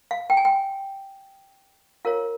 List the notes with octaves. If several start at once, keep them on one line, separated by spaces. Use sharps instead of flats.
F5
G5
G#5
G5
F4 A#4 C#5 F5